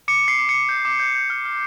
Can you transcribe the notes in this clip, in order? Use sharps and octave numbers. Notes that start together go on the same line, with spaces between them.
D6 C#7
D6 C7
D6
C#7
D6
G6
D6
G6
G6
F6
F6